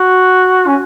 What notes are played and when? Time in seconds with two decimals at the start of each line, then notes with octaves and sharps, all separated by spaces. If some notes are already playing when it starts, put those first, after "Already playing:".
Already playing: F#4
0.67 C#4